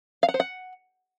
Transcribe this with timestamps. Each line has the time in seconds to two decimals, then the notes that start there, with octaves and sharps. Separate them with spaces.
0.23 F5
0.28 F#5
0.34 C5
0.40 F#5